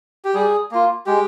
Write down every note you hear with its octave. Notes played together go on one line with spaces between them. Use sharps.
G4
G3 G#4
A#3 F4
G#3 G4